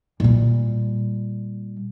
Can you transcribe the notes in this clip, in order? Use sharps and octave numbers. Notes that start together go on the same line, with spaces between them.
A#2 G3